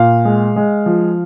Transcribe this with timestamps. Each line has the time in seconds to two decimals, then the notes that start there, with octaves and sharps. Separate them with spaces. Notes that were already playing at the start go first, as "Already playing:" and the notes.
Already playing: A#2 F5
0.25 G#3
0.56 G#3
0.86 F3